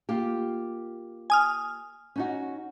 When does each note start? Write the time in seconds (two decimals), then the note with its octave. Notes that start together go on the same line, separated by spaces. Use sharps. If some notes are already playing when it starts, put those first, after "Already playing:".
0.09 A#3 F4 G4
1.30 G#5 D#6 F6
2.16 C#4 D#4 F#4